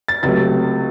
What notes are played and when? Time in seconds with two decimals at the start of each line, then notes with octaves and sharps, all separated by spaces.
0.08 A6
0.23 C#2 C3 F#3 A3 A6